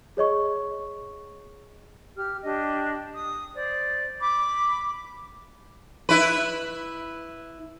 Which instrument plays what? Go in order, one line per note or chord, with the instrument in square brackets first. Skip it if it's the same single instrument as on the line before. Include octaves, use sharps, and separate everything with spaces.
[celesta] G#4 C#5 D#5 C#6
[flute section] G4 F6
D4 G4 D#5
D#6
C5 D5
B5 D6
[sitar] E4 B4